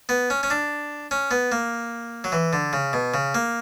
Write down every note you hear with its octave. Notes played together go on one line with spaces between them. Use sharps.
B3
C#4
C#4
D4
C#4
B3
A#3
F#3
E3
D3
C#3
B2
C#3
A#3